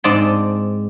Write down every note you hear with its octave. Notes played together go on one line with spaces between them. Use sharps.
G#2 G#3 C4 D5 A5 C6